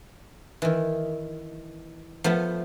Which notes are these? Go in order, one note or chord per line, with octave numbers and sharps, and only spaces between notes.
D#3 E3
F3 A3 B3